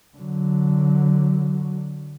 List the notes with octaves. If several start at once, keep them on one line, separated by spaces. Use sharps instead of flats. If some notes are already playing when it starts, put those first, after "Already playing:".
D3 F#3